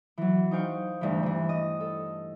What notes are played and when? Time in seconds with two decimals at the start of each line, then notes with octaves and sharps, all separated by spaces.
0.18 E3 F#3
0.51 D#4 C5 F5 G5 C#6
1.01 D2 G2 E3
1.23 G2 E3
1.49 D#5
1.80 A4